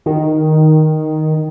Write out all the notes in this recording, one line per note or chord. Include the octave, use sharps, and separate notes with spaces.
D#3